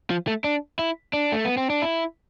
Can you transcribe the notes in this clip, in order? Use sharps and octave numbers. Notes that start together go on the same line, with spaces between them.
F3
A3
D4
E4
D4
A3
B3
C4
D4
E4